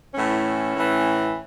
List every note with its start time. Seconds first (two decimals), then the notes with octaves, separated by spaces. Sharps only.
0.14 A2 E3 C#4
0.75 A2 E3